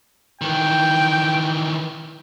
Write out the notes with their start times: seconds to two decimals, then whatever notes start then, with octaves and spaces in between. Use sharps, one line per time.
0.41 D#3 E3 G5